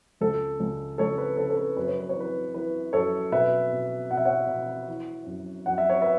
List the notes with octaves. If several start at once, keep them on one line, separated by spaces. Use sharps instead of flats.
C#2 A4
C#2
C#2 A4 C#5
B4
C#3 A4
A4
B4
F#2 B4
C#5
B4
C#5
E3
B4
E3 B4
F#2 A4 C#5
B2 B4 E5
B2
B2 F#5
E5
C#5 F#5
B2
E3
F#2
F#2 F#5
E5
C#5
B4 E5